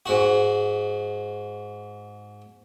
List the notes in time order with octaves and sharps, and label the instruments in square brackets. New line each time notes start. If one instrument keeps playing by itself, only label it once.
[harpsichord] G#2 F#4